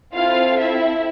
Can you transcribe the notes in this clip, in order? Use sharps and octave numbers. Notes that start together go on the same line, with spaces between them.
C4 E4 F4 A4 F5
E4 E5